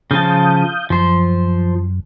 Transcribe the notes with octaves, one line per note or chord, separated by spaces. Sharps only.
C#3 F3 F5 A5 D#6 G6
F#2 F3 C5